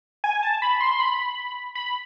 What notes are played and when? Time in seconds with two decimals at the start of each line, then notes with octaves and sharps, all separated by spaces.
0.24 G#5
0.43 A5
0.62 B5
0.81 C6
0.92 C6
1.00 B5
1.75 B5